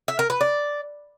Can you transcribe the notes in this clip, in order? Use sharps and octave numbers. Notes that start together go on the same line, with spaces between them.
E5
A#4
B4
D5